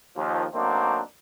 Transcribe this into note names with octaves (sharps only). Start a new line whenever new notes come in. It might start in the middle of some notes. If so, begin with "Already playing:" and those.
D#2 F3
F#3 A3 A#3 C4 D4 D#4